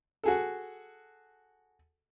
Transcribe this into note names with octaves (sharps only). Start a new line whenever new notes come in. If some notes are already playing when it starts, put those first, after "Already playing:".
F#4 G#4 A4